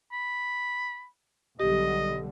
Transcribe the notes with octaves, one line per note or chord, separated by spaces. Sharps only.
B5
B1 D3 G3 G4 D#5